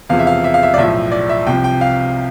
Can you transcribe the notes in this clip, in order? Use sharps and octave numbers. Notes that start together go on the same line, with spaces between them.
E1 E2 C3 F3 F5
E5
F5
E5
F5
E5
D5
B1 A2 F3 E5
D5
E5
C2 C3 F3 G5
G5
F5